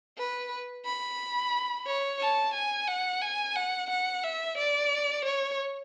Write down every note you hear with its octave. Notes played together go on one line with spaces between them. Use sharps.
B4
B5
C#5
A5
G#5
F#5
G#5
F#5
F#5
E5
D5
C#5